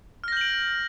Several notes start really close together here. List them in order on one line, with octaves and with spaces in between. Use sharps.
F6 A#6 G6 F#7 D7